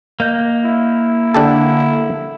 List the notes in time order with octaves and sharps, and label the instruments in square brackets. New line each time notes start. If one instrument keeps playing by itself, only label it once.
[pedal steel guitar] A#3 D#5 G6
[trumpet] E4
[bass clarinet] D3 [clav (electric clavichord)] D4 G4 A4